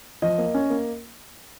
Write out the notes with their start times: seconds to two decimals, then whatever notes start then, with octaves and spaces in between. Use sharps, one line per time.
0.22 F3 D#5
0.38 A#3
0.54 C#4
0.70 A#3